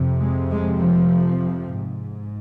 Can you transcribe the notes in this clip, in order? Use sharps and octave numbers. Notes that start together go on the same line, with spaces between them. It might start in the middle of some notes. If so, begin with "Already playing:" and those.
Already playing: F2 C3
G#3
G#3
F3
G#2